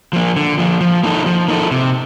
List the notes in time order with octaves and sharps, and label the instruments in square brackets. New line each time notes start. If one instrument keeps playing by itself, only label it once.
[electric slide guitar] F3 A#3
D3
F3 A#3
F3
A#3 D#4 A4
F3
A#3 D#4 A4
C3